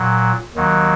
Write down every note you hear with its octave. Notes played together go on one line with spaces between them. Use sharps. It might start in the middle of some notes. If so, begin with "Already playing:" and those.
Already playing: A#2 F#3
D#2 D#3 F#3